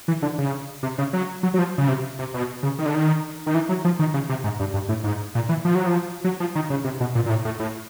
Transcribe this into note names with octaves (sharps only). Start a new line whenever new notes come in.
E3
D3
C#3
C3
C#3
F#3
F#3
F#3
F3
C#3
C3
C3
B2
C#3
D#3
D3
D#3
D#3
E3
F#3
F3
D#3
C#3
C3
G#2
G2
G2
A2
G#2
A#2
E3
F3
F#3
F3
F#3
F3
D#3
C#3
C3
B2
A#2
A#2
A2
A2
A2